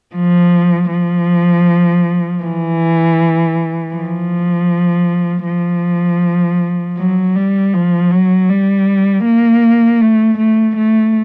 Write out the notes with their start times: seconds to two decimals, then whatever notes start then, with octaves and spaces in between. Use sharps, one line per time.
0.16 F3
0.91 F3
2.43 E3
3.94 F3
5.46 F3
6.98 F#3
7.36 G3
7.74 F3
8.11 F#3
8.49 G3
9.25 A#3
10.01 A3
10.38 A3
10.77 A3